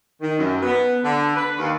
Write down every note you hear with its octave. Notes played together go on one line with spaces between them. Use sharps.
D#3
F#2
B3
D3
B4
D#2